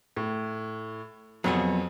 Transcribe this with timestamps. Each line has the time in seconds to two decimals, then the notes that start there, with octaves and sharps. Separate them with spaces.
0.16 A2
1.44 F2 F#3 B3 G#4